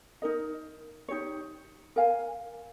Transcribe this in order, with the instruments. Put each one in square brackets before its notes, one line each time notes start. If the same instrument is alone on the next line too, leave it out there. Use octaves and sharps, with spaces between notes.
[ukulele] D#4 A#4 D#5
D#4 G4 C#5
A#4 F5 G#5